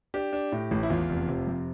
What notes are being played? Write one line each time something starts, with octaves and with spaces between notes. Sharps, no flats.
D4 G4
D4
A2
A1
E4
E2 F4
F1
C3
F2